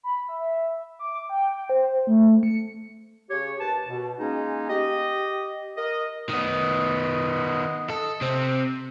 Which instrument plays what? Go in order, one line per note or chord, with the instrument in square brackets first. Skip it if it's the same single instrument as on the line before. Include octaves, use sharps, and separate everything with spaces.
[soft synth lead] B5
E5
D6
G5
C5
A3
C#7
[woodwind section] C#3 G4 C#5
D#2 B4 A5
B2
G#3 A#3 C#4 D#4
G4 D#5
A#4 D#5
[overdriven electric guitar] D#3 B3 [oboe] D#5
[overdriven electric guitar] A4
C3 C4